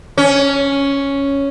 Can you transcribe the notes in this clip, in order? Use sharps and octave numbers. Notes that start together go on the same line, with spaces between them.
C#4